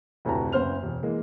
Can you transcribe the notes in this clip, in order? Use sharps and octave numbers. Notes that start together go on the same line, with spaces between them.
F1 D2 A2 B4 A5 A#5
F#1 B3 C#4 C5 F6 F7
E1
E3 G#3 A#3